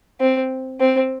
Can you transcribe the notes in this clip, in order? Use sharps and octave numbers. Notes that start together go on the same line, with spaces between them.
C4
C4